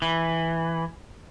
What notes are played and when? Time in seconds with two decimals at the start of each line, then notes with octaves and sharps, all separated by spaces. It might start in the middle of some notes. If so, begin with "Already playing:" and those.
0.02 E3